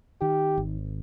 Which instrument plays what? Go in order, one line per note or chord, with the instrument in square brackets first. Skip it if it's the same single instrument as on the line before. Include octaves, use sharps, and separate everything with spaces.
[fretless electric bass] D#3 [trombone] G4
[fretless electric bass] G#1